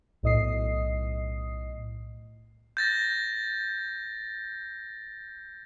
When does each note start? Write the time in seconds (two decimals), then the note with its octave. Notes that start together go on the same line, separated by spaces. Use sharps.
0.23 B1 A2 D#5 D#6 C7
2.77 G6 A6 A#6